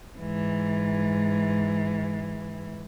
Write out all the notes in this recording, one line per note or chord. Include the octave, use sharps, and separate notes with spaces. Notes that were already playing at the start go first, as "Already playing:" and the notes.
G#2 E3